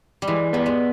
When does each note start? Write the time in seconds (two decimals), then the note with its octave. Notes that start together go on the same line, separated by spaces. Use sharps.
0.22 G3
0.27 E3 G#3
0.53 G3 B3
0.66 G#3